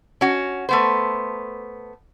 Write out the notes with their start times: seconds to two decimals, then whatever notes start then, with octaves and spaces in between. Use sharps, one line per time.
0.21 C#4 F#4
0.69 A3 B3 C5